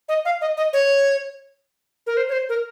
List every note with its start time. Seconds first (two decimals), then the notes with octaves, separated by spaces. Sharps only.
0.09 D#5
0.25 F5
0.41 D#5
0.57 D#5
0.73 C#5
2.07 A#4
2.17 C5
2.29 C#5
2.33 C5
2.49 A#4